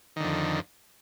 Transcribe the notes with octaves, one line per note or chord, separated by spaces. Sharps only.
F2 D3 D#3